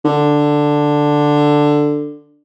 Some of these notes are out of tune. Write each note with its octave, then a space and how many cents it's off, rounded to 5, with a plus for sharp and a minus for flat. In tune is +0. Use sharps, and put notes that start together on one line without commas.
D3 +5